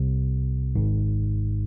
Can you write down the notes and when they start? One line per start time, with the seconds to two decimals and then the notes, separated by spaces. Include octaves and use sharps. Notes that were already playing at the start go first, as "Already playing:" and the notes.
Already playing: C2 C3
0.75 G#1 G#2